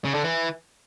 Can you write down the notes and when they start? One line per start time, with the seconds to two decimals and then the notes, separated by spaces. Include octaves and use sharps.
0.05 C#3
0.14 D3
0.24 E3